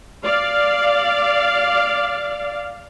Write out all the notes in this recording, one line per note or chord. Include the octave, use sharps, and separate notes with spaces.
D5 F5